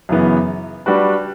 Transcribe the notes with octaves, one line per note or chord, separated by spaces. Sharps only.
F#2 C#3 E3 B3
G3 D4 F#4 B4